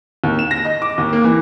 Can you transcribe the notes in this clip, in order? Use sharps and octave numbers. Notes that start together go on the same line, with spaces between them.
D#2
E7
A#6
D#5
D6
D#2
A#3
E3